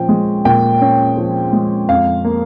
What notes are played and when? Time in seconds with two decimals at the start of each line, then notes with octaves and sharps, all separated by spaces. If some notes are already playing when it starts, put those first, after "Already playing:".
Already playing: A#2 F3 C#4 G5
0.09 G#3
0.45 A#2 G5
0.81 C#4
1.17 F3
1.53 G#3
1.88 F2 F5
2.24 A#3